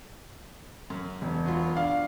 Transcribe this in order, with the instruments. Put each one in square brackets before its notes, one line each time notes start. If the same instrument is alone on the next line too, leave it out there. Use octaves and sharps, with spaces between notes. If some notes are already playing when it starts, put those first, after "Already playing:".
[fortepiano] F#2
[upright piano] E1
[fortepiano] F#3 B3 F4
[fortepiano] D4 [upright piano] F5